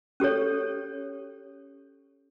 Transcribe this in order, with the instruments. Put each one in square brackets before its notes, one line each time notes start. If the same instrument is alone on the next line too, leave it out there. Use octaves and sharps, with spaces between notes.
[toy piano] C#4 G4 A4 C#5